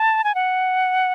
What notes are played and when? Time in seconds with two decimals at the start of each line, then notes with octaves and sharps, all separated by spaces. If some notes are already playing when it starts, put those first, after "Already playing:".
Already playing: A5
0.24 G#5
0.35 F#5